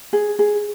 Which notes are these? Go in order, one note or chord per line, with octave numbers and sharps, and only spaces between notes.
G#4
G#4